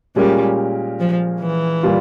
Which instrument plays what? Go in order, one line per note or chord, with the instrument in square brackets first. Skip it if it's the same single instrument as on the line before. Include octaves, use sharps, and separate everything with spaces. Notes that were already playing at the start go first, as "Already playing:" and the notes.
[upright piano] A#2 G#3 C#4 G4 A#4 [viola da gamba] G3
[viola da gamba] F3
E3
[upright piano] A#2 G3 A#3 F4